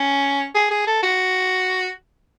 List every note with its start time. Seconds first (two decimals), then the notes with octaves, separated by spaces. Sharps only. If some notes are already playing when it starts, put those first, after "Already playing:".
Already playing: C#4
0.55 G#4
0.71 G#4
0.87 A4
1.03 F#4